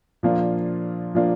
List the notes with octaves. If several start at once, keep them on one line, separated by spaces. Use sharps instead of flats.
A#2 F3 A#3 D4 F4
A#2 F3 A#3 D4 F4